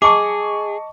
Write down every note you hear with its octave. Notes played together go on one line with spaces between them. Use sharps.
G#4 D#5 A5 C#6 D6